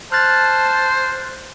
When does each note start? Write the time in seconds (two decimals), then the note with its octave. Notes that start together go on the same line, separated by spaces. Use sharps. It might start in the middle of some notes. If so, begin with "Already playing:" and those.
0.12 C5 A5 F6 F#6 A6